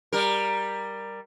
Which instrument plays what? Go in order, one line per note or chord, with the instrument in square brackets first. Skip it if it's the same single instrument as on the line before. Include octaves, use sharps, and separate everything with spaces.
[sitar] G3 A#4